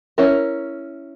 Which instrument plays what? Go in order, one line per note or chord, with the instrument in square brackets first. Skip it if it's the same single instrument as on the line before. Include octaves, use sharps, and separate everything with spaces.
[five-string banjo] C#4 E4 A#4